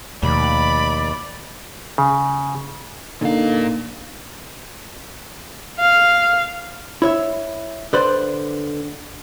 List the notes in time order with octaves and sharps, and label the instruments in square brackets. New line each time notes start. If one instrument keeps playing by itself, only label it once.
[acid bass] D#2 [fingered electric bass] B2 F3 A3 [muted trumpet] D5 [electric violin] B5
[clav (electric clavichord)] C#3
[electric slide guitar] A#2 F5 [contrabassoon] D3 [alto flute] A#3 [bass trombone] D#4
[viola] F5
[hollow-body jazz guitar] E4 C#5 E5
D3 B4 C5 D5